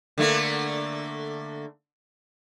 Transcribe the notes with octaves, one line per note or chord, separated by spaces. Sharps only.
D3 A3 A#3